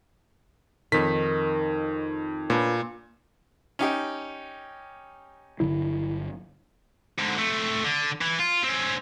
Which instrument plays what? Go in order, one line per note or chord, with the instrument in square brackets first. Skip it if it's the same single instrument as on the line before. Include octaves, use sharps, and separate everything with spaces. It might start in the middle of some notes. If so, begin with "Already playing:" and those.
[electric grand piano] F2 B6 [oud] D#3
[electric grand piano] A#2 [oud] D4 B4
[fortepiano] C#4 D#4 G4
[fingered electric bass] G1 D3 F#3 [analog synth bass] E4
[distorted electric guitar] G#2 D3
A3 C4
D3
E3
F4
C4 C#4